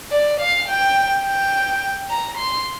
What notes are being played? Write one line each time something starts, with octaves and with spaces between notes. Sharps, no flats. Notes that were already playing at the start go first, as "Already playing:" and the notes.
D5
F5
G5
G5
A#5
C6